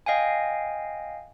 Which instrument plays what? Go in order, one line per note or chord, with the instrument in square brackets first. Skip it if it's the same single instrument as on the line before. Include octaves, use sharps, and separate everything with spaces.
[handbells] D#5 F5 G5 G#5